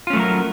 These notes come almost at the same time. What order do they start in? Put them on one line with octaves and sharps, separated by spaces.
F4 C#4 A3 F#3 A#4